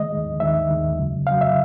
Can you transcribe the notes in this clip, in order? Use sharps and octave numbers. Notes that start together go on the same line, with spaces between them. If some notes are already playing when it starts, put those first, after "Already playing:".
Already playing: D#3 G#3 D#5
D#2 D#3 G#3
D#2 D#3 G#3 E5
D#2 D#3 G#3
F2 C#3 F#3
F2 C#3 F#3 F5
E5